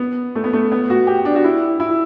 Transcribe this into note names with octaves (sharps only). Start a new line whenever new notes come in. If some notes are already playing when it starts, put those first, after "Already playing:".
Already playing: B3
A3
B3
A3
B3
F#4
G4
D4
F#4
E4
E4